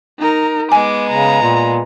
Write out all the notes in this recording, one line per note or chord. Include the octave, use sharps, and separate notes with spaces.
D#4 A#4
G#3 B3 G#5 D6
C#3 A#5
A#2